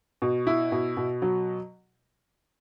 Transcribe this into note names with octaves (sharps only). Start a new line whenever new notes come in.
B2
E4
B2
B2
F#3